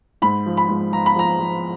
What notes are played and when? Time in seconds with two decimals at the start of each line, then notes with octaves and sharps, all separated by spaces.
0.22 G#2 B5
0.46 F3
0.57 B5
0.69 G#2
0.93 F3 A#5
1.06 B5
1.16 F3 A#5
1.40 F3